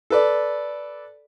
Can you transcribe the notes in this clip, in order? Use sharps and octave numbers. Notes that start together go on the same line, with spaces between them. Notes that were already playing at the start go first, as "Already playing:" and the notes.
A4 B4 D5